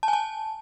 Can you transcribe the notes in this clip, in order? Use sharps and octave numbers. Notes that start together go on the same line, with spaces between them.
A5
G#5
A5